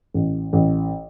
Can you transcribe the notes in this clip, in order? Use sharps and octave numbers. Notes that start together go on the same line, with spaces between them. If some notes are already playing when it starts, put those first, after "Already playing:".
A1
A1